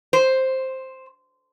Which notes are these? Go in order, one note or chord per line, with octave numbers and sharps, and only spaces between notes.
C5